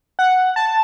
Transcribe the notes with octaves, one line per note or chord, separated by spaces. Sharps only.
F#5
A5